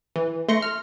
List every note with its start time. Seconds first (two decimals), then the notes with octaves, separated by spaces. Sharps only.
0.16 E3
0.49 A3 C6 A#6 C#7
0.62 F6